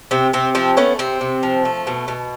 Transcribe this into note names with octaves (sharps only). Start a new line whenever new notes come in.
C3 C4
C3 C4
F3 C4
A3 B3 C#4
C3 C4
C3
F3
A3
B2
B2